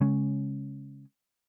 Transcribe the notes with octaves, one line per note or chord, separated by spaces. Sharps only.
C#3 G#3 C#4